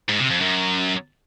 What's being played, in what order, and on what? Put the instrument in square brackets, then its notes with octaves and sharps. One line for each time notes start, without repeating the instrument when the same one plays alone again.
[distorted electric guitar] G#2
C3
F2
F#2